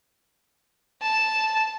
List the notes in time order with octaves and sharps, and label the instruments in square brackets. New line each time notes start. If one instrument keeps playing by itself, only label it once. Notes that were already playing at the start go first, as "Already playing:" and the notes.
[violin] A5